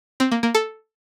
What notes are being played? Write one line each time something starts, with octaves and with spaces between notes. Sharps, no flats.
C4
A#3
A#3
A4